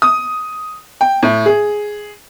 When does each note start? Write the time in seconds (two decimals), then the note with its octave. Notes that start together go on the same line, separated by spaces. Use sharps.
0.02 D#6
1.01 G5
1.23 A2
1.46 G#4